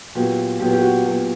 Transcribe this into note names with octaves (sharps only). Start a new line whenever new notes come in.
A#2 F#3 B3 G4
A#2 F#3 B3 G4
G4
F#4
A#2 F#3 B3